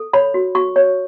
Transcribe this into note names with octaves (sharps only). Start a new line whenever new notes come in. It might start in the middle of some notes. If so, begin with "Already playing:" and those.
Already playing: A4
C#5 B5
F#4
F#4 C#6
C#5